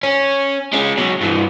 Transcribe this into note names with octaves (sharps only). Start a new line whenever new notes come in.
C#4
G#3 C#4
B2 F#3
G2 E3